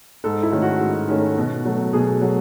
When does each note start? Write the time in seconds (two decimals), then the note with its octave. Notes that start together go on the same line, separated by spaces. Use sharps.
0.24 G#2 A4
0.43 E4
0.52 D#3 A3 C#4
0.62 F#4
0.81 G#2
1.09 D#3 A3 C#4
1.37 B2
1.65 F#3 A3
1.93 B2 G#4
2.21 F#3 A3